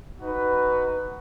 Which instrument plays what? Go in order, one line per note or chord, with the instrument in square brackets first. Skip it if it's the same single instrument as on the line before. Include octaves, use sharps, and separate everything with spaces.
[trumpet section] D#4 F#4 B4